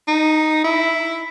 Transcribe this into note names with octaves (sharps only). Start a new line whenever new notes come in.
D#4
E4